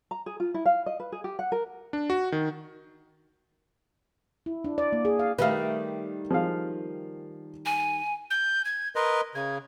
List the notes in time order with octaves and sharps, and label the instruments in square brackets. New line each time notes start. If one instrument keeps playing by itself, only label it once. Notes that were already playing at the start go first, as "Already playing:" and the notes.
[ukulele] A#5
G#4
F4
E4
F5
D#5
B4
G#4
G4
F#5
A#4
[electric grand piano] D4
F#4
D#3
[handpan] E4
D4
D5
A#3
G#4
F5
[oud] D#3 G3 A3 [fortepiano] B4 F5
[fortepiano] F3 G#3 F5
[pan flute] G#5
[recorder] G6
G#6
[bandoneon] A#4 B4 D#5 [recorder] C6
[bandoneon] C#3 [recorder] G#6